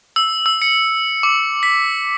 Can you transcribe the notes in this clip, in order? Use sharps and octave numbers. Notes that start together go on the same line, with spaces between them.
E6
E6
C#7
D6
B6